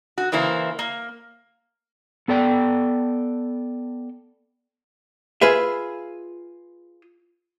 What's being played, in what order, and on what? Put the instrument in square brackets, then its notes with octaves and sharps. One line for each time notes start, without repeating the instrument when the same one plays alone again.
[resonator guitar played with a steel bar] F#4
C#3 E3 A#3 E4 C5
A#3
[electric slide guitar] B3 A4 D5 G5
[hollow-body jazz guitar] F4 G#4 B4 E5